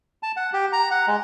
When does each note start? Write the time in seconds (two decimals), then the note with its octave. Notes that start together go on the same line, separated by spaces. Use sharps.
0.23 A5
0.37 F#5
0.53 G4
0.73 A#5
0.91 F#5
1.07 G#3